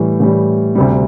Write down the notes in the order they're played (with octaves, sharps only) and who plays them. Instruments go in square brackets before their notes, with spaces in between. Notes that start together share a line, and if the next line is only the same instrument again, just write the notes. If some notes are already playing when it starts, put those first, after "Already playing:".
Already playing: [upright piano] A2 E3 G3
A2 E3 G3
D2 C3 G3